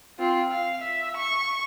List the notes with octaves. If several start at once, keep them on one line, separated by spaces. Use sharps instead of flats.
C4 F4
F5
E5
C#6